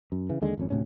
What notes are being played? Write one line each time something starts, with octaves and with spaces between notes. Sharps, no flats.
F#2
C#3 E3
D#2 D3 G#3
G#1 F2 C#4
D2 A2 C3 C#4